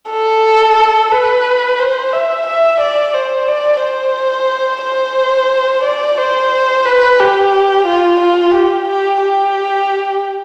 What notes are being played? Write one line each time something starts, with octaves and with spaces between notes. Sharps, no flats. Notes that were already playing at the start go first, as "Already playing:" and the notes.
A4
B4
C5
E5
E5
D5
C5
D5
C5
C5
D5
C5
B4
G4
F4
F4
G4
G4
G4